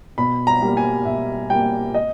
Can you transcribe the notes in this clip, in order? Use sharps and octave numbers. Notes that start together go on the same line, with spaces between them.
B2 B5
A#5
G3 A#3
G#5
B2 E5
G3 A#3 G5
D#5